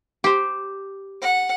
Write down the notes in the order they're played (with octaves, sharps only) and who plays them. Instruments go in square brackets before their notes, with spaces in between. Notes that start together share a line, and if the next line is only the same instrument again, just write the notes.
[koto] G4 C5
[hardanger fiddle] F#5